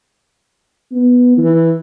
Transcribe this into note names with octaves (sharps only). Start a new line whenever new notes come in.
B3
E3